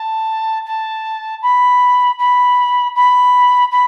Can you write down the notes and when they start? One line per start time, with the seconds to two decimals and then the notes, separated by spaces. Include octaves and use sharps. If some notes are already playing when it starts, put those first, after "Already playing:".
Already playing: A5
0.66 A5
1.42 B5
2.18 B5
2.95 B5
3.71 B5